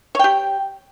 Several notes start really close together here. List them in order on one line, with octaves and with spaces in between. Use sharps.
C#5 G5 G4